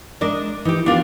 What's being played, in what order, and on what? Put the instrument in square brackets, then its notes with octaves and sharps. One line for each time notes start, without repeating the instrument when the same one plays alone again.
[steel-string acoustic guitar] G#3 D5 [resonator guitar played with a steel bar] D4 A#4 D#5
[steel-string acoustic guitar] E3 [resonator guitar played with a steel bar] D#4 G4
[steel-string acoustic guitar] B3 G4 [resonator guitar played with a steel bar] D4 F4 A#4